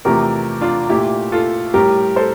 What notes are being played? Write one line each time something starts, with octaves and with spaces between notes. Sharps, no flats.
E2 C3 F3 A3 G4 A#4
D4 F4
A#2 A3 E4 G4
F4 A4
A2 G3 G4 A#4
A4 C5